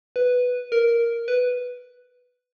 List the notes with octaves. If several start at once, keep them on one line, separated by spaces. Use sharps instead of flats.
B4
A#4
B4